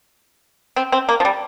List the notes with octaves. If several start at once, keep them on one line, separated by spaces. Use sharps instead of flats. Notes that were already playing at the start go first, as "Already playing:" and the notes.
C4
C4
A#3
F3
G3